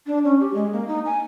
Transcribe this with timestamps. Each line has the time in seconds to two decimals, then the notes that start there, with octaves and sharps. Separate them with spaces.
0.06 D4
0.24 C#4
0.40 G4
0.54 G#3
0.72 A#3
0.88 D#4
1.05 G#5